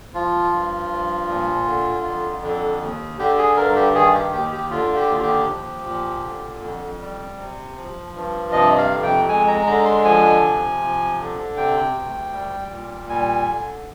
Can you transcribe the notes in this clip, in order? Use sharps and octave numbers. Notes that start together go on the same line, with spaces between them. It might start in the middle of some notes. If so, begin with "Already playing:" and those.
F3 F4
G2
F3
A#2
D3
F2
D3
D#2
D3 G4
G#4
G2 A#4
G4
D#3 G#4
G4
D#2 G4
G4
D3 F4
G4
D#2 F4
G4
F3
A#2
D3
F2
G3
C3
F3
G2
C3 D#5
F5
F2
G5
G#3 G#5
A#5
D3 A#5
C6
F3 G#5
C3
F3
D3
C3 G5
D2
G3
A#2
G3 G#5
D3